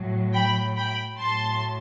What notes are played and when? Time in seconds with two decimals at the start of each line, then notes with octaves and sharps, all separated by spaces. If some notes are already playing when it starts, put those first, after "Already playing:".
Already playing: A2 F#3
0.33 G5 B5
0.76 G5 B5
1.19 A2 F#3 A5 C6